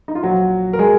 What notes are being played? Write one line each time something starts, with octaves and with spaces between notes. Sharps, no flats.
D#4
F4
A#1 A#2 F#3 F#4
A#4
G#3 G#4